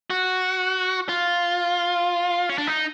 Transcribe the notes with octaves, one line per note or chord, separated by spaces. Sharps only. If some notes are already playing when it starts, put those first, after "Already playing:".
F#4
F4
C#4
D4
D#4